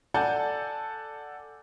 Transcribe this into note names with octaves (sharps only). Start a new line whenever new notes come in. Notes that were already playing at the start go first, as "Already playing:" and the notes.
A4 D5 F#5 G#5 A5 G6